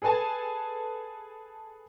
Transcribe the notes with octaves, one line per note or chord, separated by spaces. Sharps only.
G#4 A4 B4 G#5 A5